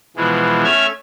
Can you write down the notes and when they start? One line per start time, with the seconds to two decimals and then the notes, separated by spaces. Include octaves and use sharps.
0.17 B2 E3 F3 G#3
0.64 A3 C#4 E5 F6 G#6